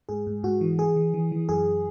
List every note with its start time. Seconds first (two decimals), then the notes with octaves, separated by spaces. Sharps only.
0.09 G#2 G#4
0.27 G#2
0.43 G#2 F#4
0.61 E3
0.79 E3 G#4
0.96 E3
1.14 E3
1.32 E3
1.49 F#2 G#4